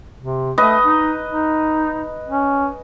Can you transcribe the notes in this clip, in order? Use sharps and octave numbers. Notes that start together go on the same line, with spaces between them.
C3
A3 B4 D#5
D#4
D#4
C#4